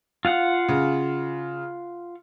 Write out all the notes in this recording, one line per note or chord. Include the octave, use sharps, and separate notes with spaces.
F4 F5 F#5
C#3